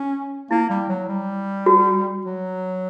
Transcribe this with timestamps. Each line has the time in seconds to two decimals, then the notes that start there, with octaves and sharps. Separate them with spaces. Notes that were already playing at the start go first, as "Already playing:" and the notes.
Already playing: C#4
0.51 A#3 E4
0.70 G3
0.89 F#3
1.08 G3
1.66 F#4
2.25 F#3